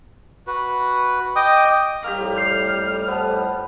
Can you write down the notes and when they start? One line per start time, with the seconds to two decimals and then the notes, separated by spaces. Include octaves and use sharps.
0.47 F#4 B4
1.36 D#5 G5 D6 D#6
2.04 F2 A2 G3 A#3 C4 G4 F6
2.36 G6 C7 F7
3.08 B3 C5 A5 D#6